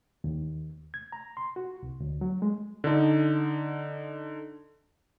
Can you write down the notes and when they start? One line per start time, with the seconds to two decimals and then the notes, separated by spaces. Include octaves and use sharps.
0.24 D#2
0.94 G#6
1.12 A#5
1.37 C6
1.56 F#4
1.83 C2
2.00 D2
2.21 F#3
2.42 G#3
2.84 D3 D#4